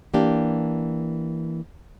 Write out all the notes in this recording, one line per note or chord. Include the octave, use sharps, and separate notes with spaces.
E3 A#3 D4 G4